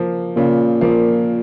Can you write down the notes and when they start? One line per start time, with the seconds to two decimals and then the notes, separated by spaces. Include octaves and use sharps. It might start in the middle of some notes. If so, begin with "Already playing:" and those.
Already playing: F3 A#3
0.37 A#2 C#3
0.81 F3 A#3